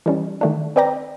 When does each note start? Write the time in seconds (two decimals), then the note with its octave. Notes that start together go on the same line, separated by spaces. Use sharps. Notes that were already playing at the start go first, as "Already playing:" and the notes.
0.06 E3 G3 C#4
0.41 D#3 A3 D4
0.76 C4 B4 D5 G5 A#5 A6